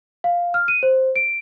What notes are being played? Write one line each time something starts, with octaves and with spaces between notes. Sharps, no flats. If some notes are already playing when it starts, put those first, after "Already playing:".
F5
F6
D#7
C5
D7